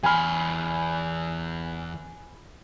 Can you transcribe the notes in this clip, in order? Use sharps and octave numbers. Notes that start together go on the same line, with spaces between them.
E2 G#5 B5 C6 F6